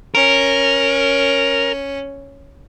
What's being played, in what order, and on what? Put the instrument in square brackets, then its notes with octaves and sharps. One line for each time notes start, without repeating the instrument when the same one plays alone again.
[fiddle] C#4 [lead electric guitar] A#4